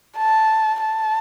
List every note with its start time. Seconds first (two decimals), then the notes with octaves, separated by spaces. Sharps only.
0.18 A5
0.81 A5